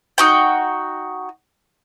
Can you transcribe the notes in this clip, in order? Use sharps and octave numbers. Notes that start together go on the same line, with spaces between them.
D#4 F#4 G5